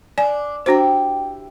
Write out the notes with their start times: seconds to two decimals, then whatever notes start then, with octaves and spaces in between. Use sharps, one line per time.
0.18 D4 D5 G#5
0.66 D4 E4 F#4 G4 C5 G5